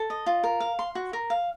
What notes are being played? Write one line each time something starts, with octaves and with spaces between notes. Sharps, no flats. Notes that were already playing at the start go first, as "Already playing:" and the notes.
Already playing: A4
D#5
F4
A#4
F5
C6
F#4
A#4
F5